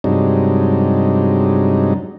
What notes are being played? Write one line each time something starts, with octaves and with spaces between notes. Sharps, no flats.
G2 C3 F#3 G#3 D4 D#4